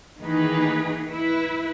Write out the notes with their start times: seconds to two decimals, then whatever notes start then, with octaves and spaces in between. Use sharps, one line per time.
0.18 D#3 E3 A#3 D#4 G#4 B4
1.10 E4 B4